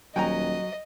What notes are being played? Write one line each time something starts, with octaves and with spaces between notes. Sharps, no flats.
D#1 F#3 D#5 G5 G#5 A#5